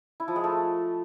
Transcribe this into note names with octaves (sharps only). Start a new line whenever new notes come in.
E4
F3
G#3
A3